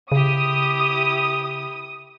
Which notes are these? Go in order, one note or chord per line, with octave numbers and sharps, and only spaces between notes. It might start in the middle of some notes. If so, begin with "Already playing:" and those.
C#3 E4 G4 D#6